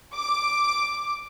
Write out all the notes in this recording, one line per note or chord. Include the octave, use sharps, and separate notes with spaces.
D6